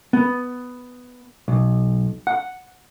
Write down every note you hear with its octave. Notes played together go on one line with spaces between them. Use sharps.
B3
B1
F#5